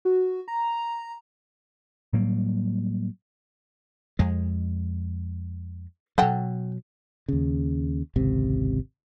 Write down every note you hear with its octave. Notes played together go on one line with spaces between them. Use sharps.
F#4
A#5
A2 F#3 G3 A#3
F2 G#3
B2 F#3 A4 F#5 G5
D#2 C#3
G#1 C#2 C3